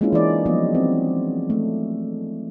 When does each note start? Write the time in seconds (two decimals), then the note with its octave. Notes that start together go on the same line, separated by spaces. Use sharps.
0.01 G#3 A#3 C#4 D4 E4 F4
0.13 E3 D#4 D5
0.46 F3 F#3 B3 D5 D#5
0.75 C4
1.50 A3